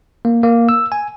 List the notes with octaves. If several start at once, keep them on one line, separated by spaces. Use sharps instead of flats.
A#3
A#3
E6
G#5